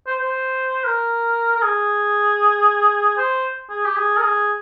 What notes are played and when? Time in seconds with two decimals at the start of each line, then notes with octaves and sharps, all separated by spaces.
0.07 C5
0.20 C5
0.85 A#4
1.57 A#4
1.62 G#4
3.18 C5
3.70 G#4
3.84 G4
3.96 G#4
4.17 A#4
4.22 G#4